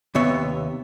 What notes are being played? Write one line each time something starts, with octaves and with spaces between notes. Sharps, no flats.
D#2 C3 B3 C#5 E5